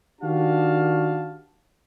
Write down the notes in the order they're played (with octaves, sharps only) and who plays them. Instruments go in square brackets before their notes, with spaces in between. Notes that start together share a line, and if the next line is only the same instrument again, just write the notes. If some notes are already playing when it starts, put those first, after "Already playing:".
[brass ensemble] D#3 D4 F#4 G4 F5 A5